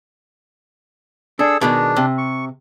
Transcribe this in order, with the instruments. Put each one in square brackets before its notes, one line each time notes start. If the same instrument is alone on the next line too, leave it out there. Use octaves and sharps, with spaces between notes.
[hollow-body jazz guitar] D4 [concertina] G#4 A4 E6
[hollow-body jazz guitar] B2 D#3 G#3 [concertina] D4
[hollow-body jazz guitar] C3
[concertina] C#6